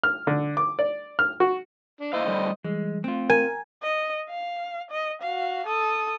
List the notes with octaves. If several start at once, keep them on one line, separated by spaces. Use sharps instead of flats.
F6
D3
D6
D5
F6
F#4
D4
A#3 E4 C5 D#5 F5
A2 D3 G3
E3 G3 G#3
A3 C4 F4
A#4 G#5
D#5
F5
D#5
F#4 F5
A4 D#6